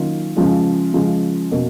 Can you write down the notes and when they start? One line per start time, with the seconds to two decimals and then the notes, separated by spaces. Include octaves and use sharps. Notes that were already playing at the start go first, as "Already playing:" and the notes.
Already playing: D#3 F#3 A#3 C#4 F4
0.36 C#3 F3 G#3
0.93 C#3 F3 G#3
1.51 B2 A#3 C#4 F#4